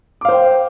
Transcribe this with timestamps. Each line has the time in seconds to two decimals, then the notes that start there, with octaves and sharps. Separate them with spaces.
0.21 D6
0.25 F5
0.29 C5
0.32 G5